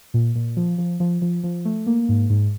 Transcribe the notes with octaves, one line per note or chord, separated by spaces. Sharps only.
A#2
A#2
F3
F3
F3
F3
F3
A3
A#3
G#2
G#2